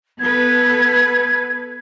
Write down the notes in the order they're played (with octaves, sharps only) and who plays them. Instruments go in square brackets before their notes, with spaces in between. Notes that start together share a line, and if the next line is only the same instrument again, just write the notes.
[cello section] B3 A4 B4 [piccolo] G#6